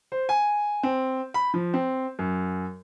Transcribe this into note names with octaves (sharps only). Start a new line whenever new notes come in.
C5
G#5
C4
B5
F3
C4
F#2